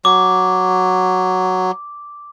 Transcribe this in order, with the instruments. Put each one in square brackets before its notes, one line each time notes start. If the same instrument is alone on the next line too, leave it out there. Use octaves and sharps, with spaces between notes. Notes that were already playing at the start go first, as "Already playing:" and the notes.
[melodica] F#3 [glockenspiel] D6